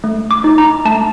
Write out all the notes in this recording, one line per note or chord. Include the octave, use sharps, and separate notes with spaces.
A3
D6
D#4
A#5
A3 A5